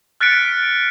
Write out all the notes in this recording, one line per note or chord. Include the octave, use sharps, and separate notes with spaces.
F6 F#6 A6 B6 C#7 D7